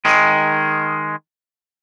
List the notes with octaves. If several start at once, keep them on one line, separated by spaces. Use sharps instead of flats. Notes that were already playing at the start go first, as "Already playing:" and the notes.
D#3 G#3